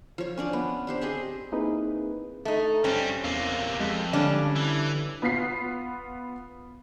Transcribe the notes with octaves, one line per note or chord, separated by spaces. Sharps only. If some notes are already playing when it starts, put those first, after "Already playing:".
F3 C#5
C#4 D4 D5
B3
D4 G4 C5
C4 G4 G#4 D#5
A#3 C4 D#4 E4 G#4 B4
A3 D#4
G2 G3 C4 C#4
E2 C3 A#3
F2 G#3
D3 G3 C#4 D4
E3
B3 F4 B6 C7